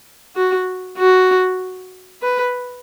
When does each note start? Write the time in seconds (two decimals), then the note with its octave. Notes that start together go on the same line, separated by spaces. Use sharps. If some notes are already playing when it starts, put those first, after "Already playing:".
0.36 F#4
0.98 F#4
2.22 B4